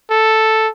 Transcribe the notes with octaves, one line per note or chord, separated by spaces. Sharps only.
A4